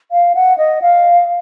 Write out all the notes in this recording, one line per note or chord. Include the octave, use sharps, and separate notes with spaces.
F5
F#5
D#5
F5